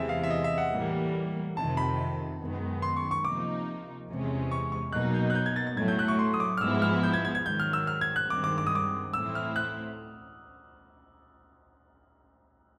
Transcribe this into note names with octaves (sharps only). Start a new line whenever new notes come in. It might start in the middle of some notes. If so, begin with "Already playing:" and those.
Already playing: E2 C3 E3 G#3 E5
F5
E5
D#5
E5
F#5
A2 E3 G3 A#3
F2 C3 D#3 A5
B5
F#2 D#3 G#3 B3
C6
C#6
C#6
C3 F3 A#3 D#4 D6
E2 C3 E3 G#3 C#4
C#6
C#6
B2 F#3 A#3 D#4 F#6
G6
F#6
G6
G#6
A6
A6
A2 F#3 A3 G#6
G6
F#6
C#6
C6
D#6
D6
F6
G#2 F3 G#3 B3 E4 E6
F6
G6
G#6
G#6
G#6
G#2 D#3 F#3 G6
F6
E6
F6
G#6
F#6
G2 D#3 G#3 C4 D6
D6
D6
D#6
D6
A2 E3 A3 C4 E4 E6
F6
F#6